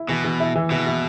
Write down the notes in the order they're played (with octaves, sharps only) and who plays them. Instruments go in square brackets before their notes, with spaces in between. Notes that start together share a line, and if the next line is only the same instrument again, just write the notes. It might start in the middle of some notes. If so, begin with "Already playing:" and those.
Already playing: [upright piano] E4
[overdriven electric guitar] B2 [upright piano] E3
[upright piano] E3
E4
E3
[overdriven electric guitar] B2 [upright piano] E3
[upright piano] E3